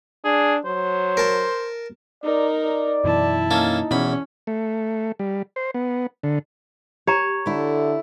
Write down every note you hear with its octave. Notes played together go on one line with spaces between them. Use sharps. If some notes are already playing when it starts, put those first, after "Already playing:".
D4 G#4
F#3 C5
A#4 A5
D#4 A#4 D5
D5
F#2 B2 E3 E4 A5
A#3 C#4 D#4 A4
E2 B2 C#4 B5
A3
G3
C5
B3
D3
G4 C#5 A#5
D3 A3 E4